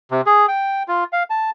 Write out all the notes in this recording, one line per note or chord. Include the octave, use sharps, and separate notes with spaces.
C3
G#4
G5
F4
F5
A5